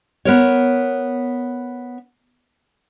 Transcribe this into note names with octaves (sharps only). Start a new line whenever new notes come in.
B3 A#4 C#5